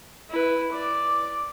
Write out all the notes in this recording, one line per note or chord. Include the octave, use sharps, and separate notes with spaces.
E4 B4
D5 D6